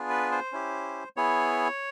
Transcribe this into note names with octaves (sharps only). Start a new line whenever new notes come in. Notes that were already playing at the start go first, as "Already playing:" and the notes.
Already playing: B3 D4 F4 G#4
B4
C5
C#4 E4 G4
B3 E4 G#4 C#5